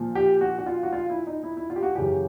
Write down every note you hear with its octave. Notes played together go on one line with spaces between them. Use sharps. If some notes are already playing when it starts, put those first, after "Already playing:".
Already playing: A#2 F3
G4
F#4
F#4
F4
F#4
F4
E4
D#4
E4
E4
F4
G4
F#4
F#2 C#3 E3 G4